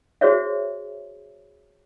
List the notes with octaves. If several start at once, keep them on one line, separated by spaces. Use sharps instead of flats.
F#4 G#4 C5 C#5 E5